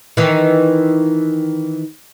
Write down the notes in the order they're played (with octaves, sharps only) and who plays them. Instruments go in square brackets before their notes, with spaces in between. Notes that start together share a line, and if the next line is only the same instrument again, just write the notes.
[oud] D#3 E3